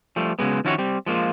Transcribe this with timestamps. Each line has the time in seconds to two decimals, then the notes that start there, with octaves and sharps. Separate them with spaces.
0.16 F3 G3 A3
0.39 C#3 F#3 G#3 B3
0.65 D#3 F3 C#4 E4 F#4 C#5
0.78 G3 C4
1.06 F3 G#3 A#3 F4